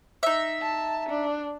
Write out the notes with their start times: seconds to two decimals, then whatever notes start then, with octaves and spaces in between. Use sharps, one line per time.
0.23 D#4 E5
0.62 A5
1.09 D4